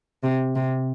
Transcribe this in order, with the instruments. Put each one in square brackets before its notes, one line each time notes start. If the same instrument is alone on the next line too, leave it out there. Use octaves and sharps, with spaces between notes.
[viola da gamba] C3
C3